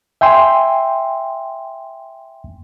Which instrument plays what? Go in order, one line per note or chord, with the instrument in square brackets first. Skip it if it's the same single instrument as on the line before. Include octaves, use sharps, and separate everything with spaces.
[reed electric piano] E5 G5 G#5 C6